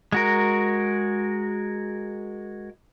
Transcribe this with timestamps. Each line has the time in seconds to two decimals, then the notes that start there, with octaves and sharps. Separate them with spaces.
0.12 G#3 F#4 A#4